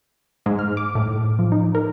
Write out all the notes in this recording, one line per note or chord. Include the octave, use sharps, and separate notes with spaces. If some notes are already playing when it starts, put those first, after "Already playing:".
G#2
F6
D6
A2
F3
D#4
A#4